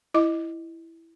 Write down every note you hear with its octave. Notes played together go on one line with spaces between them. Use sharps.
E4 D#5 D6